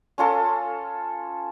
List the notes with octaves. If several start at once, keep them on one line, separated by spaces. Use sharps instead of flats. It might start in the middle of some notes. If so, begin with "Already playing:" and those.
C#4 F4 A4